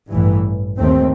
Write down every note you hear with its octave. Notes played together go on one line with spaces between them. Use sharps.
A1 G2 E3
D#2 D#3 A3 C4